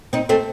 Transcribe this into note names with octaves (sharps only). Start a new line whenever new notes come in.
C4 D#4
A3 C4